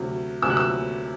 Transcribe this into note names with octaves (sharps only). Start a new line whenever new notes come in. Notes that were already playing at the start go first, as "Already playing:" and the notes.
Already playing: D2 C3 F#3
D2 C3 F#3 E6
F#6
E6